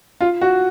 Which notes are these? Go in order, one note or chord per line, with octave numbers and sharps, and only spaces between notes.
F4
F#4